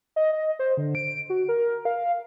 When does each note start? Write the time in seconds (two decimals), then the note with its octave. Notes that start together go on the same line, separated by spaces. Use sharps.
0.16 D#5
0.33 D#5
0.59 C5
0.77 D3
0.95 D7
1.30 F#4
1.49 A#4
1.85 F5